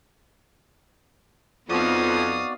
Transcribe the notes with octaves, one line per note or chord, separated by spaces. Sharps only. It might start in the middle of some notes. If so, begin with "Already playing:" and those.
F2 B3 C4 D#4 F#4 D5 F5 D#6